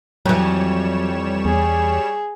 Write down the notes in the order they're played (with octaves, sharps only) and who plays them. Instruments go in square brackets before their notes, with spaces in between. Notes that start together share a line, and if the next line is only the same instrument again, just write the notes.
[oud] F2 E3 [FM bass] F#3 [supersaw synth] G3 C#5 E7
[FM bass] E2 [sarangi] G#4